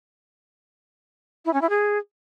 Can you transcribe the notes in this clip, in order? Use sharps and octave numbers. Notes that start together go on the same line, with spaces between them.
E4
C#4
E4
G#4